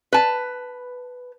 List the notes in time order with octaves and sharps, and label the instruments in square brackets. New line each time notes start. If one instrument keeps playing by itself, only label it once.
[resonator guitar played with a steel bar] B4 A5